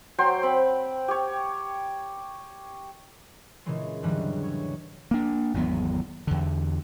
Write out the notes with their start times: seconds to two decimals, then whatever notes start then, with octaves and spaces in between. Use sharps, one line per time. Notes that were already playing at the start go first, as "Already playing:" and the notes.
0.18 F#3 C5 G5 C6
0.43 C4 B5
1.08 G4 C#5
3.66 A#2 C#3 E3 G#3
4.02 E2 G#2 D3 E3 F#3 G3
4.43 C#5
5.11 A#3 D4
5.54 G#1 E2 F#3 B3
6.27 E2 D3